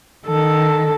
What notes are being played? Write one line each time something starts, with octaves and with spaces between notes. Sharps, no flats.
D#3 A4